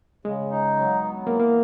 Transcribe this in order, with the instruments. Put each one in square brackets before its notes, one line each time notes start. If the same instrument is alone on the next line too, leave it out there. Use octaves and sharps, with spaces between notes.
[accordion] C#3 [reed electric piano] G#3
[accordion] D#4
F#3
B3
[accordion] E3 [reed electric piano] A#3
[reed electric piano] A#3